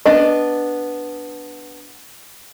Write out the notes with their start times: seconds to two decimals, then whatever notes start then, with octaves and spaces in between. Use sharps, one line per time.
0.05 B3 D4 D#5